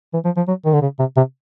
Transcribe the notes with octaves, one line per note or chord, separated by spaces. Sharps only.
E3
F3
F3
F#3
D#3
D3
C#3
C3
C3